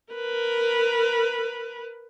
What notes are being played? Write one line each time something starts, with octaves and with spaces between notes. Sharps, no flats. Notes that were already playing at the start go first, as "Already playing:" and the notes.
A#4 B4